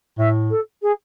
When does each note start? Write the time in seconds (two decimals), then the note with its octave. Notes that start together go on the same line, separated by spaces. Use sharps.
0.18 A2 E5
0.50 A4
0.82 G#4